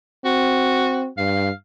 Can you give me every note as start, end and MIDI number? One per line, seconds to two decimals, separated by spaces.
0.25 1.08 60
0.25 1.07 66
1.18 1.50 43
1.18 1.52 77